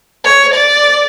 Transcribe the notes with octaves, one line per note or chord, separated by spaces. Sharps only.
C#5
D5